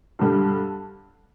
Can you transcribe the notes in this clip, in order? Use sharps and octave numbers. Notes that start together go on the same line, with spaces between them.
G2 D3 G3